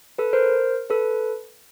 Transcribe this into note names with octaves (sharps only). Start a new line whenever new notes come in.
A4 B4
A#4 C5
A4 B4